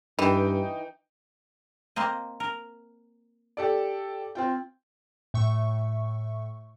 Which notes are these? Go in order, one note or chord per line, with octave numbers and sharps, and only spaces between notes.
G2 E3 D#4 G5
A#3 C4 D#5
A#4
G4 A4 D5
C4 F4 G5
A2 E5 C#6